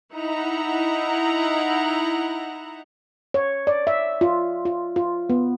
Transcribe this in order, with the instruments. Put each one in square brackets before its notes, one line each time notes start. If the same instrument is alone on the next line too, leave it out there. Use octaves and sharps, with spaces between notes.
[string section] D#4 E4 F#5 A#5
[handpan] C#5
D5
E5
F4
F4
F4
B3